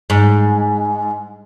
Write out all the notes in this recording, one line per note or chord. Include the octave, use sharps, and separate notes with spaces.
G#2